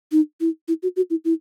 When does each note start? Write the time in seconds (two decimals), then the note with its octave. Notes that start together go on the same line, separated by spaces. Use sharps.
0.12 D#4
0.41 E4
0.68 E4
0.83 F#4
0.96 F#4
1.10 E4
1.25 E4